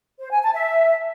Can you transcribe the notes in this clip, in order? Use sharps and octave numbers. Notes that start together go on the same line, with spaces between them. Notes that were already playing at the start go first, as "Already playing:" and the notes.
C5
G#5
A5
E5